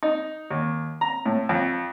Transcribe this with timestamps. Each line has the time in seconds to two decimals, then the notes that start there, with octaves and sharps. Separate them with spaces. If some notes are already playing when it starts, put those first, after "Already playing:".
0.03 D#4
0.50 D#2
1.01 A#5
1.26 A2
1.49 F2